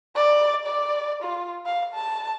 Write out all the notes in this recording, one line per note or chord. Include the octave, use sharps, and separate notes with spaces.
D5
D5
F4
F5
A5